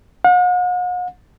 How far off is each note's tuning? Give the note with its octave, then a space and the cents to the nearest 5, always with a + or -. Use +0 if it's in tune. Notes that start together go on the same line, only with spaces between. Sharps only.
F#5 -45